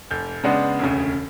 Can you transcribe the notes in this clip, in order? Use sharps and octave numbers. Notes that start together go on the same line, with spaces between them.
F1 G6
C#3 G#3 B3 D4
E1 D2 C#3